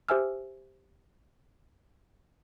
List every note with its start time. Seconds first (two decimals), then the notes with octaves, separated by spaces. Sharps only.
0.09 G4 C5 E5 G#5 E6 F6